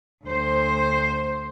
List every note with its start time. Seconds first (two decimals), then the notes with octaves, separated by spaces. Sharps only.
0.23 D2 C5